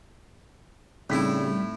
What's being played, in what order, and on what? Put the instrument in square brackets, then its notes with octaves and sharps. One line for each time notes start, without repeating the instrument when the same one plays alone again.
[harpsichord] A2 E4 [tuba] C#3 [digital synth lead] G3 [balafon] C4 D#4